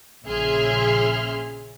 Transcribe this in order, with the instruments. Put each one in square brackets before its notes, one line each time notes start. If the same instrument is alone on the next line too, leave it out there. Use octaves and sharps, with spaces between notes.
[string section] A#1 C#3 G#4 E5 C6 F6